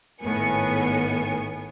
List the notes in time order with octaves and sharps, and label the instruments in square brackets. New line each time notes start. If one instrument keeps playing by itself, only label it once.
[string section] G#1 A2 D#3 B3 G#5 C#7